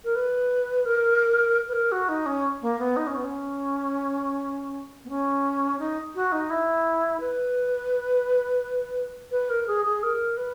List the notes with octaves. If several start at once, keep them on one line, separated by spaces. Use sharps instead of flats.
A#4
B4
A#4
B4
A#4
F#4
D#4
C#4
A#3
B3
D#4
C#4
B3
C#4
B3
C#4
D#4
F#4
D#4
E4
B4
B4
A#4
G#4
G#4
A#4
B4